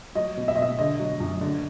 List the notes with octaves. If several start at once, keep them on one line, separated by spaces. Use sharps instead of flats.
F#3 D#5
B2
E5
D#5
B2 E5
D3 D#5
F#3
F#2
D3